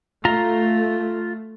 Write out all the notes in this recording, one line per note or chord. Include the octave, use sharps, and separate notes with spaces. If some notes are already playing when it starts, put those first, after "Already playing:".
A3 F4 A#5